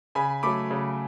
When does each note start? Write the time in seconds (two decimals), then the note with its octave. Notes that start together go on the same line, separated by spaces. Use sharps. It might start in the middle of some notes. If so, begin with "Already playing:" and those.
0.15 C#3 G#5 B5
0.43 F#3 A3 B5 D6
0.71 C#3